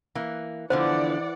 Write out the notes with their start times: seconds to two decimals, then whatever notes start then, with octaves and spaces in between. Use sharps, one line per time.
0.15 E3 A#3
0.70 D3 E3 F3 B3 C5 D5 F#5